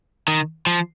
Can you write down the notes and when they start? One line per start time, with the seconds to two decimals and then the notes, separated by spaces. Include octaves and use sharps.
0.28 D#3
0.67 F3